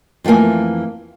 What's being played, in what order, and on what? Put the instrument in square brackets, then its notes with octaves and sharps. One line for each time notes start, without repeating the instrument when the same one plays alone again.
[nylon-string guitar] F2 E3 A3 A#3 G#5